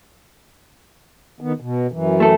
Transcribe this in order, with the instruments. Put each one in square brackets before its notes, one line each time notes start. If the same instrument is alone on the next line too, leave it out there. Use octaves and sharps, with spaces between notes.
[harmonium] D#3 B3
B2
F#2 E3
[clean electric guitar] A3 A4